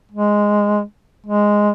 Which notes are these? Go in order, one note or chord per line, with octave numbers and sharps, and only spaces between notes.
G#3
G#3